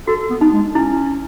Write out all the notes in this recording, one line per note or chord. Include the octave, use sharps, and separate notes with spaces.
F#4 A4
B3
D#4
G#3
C#4 E4